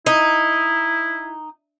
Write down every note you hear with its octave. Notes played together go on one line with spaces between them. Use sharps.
D#4 E4